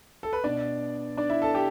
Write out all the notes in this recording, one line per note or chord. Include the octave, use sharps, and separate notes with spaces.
A4
B4
B2 B3 D4 D5
D4 D5
E4 E5
A4 A5
G4 G5